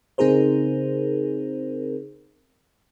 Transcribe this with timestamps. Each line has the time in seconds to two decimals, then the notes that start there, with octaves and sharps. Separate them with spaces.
0.18 C#3 C4 D#4 G#4 A#4 C5